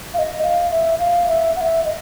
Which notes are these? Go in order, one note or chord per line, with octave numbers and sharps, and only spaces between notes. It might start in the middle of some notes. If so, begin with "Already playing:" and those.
F5
D#5
F5
E5
F5
E5
F#5
E5
D#5